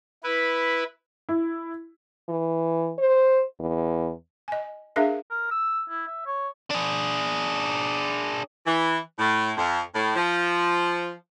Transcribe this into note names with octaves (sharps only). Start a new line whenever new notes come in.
E4 B4
E4
E3
C5
E2
D#5 G#5
D4 G#4 A#4 E5 F5
A#4
E6
E4
E5
C#5
D4 G#4
E3
A2
F2
A2
F3